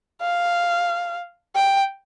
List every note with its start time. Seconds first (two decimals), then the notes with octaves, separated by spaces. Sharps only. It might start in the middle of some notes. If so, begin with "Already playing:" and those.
0.22 F5
1.56 G5